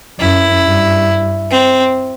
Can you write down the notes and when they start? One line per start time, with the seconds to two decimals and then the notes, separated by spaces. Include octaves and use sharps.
0.19 F#2 E4
0.63 G2
1.51 C4